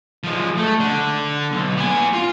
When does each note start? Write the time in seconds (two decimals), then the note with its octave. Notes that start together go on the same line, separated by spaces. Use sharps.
0.24 F3 G#3
0.57 A3
0.80 D3
1.52 B1
1.77 B3 G#5
2.13 F4